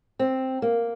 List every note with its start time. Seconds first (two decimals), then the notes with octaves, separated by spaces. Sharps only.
0.19 C4
0.62 A#3